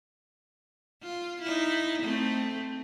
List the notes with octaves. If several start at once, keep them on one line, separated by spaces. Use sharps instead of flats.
F4
D#4 E4
A3 C4